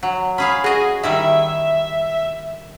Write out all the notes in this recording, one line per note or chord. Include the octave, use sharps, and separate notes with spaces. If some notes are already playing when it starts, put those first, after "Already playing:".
F#3
C#4 G#4 F5 B5
F#4 G#4 D#5
D#3 G3 E4 E5